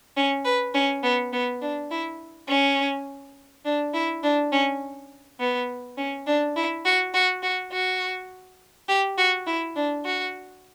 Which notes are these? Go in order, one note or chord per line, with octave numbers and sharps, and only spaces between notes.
C#4
B4
C#4
B3
B3
D4
E4
C#4
D4
E4
D4
C#4
B3
C#4
D4
E4
F#4
F#4
F#4
F#4
G4
F#4
E4
D4
F#4